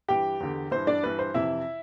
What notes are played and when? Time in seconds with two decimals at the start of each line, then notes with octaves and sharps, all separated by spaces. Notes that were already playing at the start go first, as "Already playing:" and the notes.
0.08 G2 E3 G4 G5
0.40 E2 D3
0.71 G2 E3 C5
0.87 D4 D5
1.03 G2 E3 B4
1.19 C5
1.34 F2 C3 E3 E4 E5